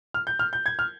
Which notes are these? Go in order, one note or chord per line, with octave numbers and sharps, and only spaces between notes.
F6
G6
F6
G6
G#6
F6